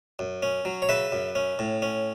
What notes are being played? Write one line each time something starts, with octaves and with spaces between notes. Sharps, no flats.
F#2
C#4
F#3
C#5
C#3 B4 E5
F#2
C#4
A2
C#4